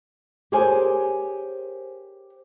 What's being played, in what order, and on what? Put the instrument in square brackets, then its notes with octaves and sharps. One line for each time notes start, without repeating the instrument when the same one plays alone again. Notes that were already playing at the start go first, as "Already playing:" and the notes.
[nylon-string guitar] G4 G#4 A#4 C5 C#5 G#5